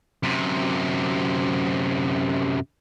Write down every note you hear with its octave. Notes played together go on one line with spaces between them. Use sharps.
F#2 C3